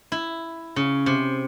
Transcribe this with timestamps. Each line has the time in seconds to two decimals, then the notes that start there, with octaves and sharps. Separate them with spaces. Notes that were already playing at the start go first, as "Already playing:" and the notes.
0.12 E4
0.76 C#3
1.06 C3